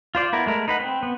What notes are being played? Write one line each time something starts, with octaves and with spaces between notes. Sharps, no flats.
F4 C5 D5
B3 E4 A#4
G#3 A3 A#4
D#4 B4 F#5
C4
B3